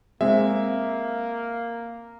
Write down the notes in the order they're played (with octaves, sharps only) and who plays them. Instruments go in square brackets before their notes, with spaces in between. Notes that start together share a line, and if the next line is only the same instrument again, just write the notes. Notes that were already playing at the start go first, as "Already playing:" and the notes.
[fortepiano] G#3 C4 [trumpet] A#3 [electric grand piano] E5